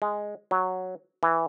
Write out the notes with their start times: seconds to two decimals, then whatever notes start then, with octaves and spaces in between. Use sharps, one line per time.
0.02 G#3
0.51 F#3
1.23 E3